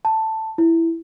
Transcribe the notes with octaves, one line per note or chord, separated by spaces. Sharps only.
A5
E4